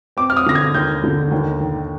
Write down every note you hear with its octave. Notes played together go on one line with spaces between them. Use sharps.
C4 D6
F6
D#6
D3 A#6
G#6
D#2 G6
D3
D#2
D#3